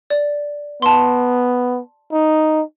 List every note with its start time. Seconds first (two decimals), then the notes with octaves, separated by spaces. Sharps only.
0.10 D5
0.82 B3 A5 C6
2.13 D#4